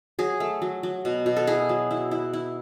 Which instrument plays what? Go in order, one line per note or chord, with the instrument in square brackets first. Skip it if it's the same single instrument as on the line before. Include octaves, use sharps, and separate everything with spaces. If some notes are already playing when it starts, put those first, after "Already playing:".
[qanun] F#3 G#4
A3
F#3
F#3
B2
B2
A4
E4 G#4
F#3
E4
E4
E4